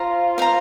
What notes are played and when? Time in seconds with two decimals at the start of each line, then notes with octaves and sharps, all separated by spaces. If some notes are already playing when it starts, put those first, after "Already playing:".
Already playing: F4 C5 F5 A#5
0.38 C5 F5 A#5